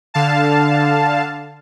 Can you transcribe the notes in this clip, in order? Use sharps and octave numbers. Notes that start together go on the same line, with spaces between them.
D3 F5 A5